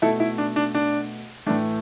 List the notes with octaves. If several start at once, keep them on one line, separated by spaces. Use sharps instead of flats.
B2 A3 E4 A4
E4
D4
D4
D4
A2 E3 A3 D4